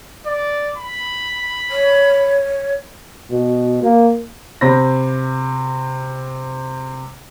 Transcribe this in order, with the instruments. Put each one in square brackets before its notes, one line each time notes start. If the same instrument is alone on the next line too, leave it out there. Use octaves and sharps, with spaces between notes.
[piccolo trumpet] D5
B5
[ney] C#5
[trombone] B2
A#3
[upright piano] C3 C5 B5 A#6